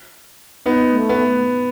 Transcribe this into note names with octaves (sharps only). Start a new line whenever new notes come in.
B3 D#4
A3
B3